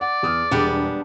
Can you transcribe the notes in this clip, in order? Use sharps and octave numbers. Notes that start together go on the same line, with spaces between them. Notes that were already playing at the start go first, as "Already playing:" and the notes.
D5 F#5
E2 D#6 F6
E1 G3 B3 D4 G#4